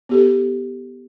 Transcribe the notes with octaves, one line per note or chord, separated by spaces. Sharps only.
B3 G4 A4